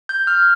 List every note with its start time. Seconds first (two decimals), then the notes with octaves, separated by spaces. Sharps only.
0.09 G6
0.27 F6